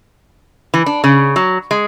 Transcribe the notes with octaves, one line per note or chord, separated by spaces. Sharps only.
E3
D4
C#3
F#3
G#3